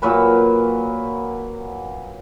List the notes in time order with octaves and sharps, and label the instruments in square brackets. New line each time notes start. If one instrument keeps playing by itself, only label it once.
[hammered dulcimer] A#2 F#3 B4 B5